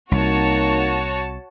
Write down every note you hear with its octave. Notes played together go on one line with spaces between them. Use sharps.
C2 A#3 D#4 F#4 C#5 A5